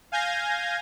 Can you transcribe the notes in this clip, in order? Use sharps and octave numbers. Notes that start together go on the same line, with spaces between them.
F5 G#5 G6 G#6 A#6